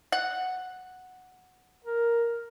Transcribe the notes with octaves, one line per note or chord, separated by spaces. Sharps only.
F#5
A#4